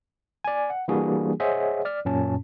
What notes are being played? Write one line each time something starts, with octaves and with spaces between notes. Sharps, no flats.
D5 G#5
F#5
E3 G3 A#3 D4 F#4 G#4
G#4 C5 C#5 D#5 E5 F#5
D5 F6
F#2 A#2 C#4 A5